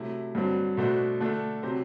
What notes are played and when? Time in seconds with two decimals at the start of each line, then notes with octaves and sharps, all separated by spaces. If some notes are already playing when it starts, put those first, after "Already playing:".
Already playing: C3 F#3 A3 E4
0.35 G2 D3 F#3 C4
0.77 B2 A3 D4 F#4 C5
1.20 D3 A3 D4 A4
1.63 C3 F#3 C4 G4 C5